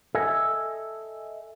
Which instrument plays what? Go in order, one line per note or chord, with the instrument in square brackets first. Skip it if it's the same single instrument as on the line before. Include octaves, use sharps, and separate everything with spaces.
[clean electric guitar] A4 D#5 E5 G#5